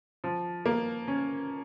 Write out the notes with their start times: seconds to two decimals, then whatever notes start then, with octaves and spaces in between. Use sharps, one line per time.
0.24 F3
0.66 A#3
1.08 C#4